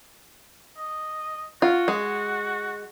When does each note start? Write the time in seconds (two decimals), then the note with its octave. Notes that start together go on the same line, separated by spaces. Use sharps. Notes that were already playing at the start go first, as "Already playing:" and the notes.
0.77 D#5
1.62 F4 F#4
1.88 G#3